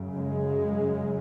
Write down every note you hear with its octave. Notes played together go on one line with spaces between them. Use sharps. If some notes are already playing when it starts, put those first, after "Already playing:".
Already playing: F#2 C#3
G#3